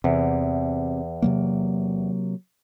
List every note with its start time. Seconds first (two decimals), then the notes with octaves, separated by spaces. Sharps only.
0.04 E2 C3
1.22 C3 F#3 A#3